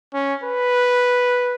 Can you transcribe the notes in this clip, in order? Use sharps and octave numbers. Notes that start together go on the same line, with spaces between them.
C#4
B4